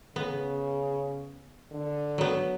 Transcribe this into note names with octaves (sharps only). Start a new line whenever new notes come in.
C#3 B3
D3
F#3 B3